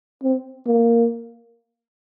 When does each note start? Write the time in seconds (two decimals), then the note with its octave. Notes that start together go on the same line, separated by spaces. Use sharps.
0.23 C4
0.66 A#3